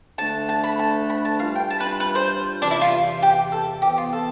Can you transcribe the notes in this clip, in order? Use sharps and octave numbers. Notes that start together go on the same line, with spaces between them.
D2 D3 A3 D4 A5
A5
B5
A5
B5
A5
G2 E3 G3 D4 F4 F5
G5
A5
B4
B4
C5
E2 C3 E3 D4
E4
F4
G4
A4
F2 E3 B3 G4
F4
A4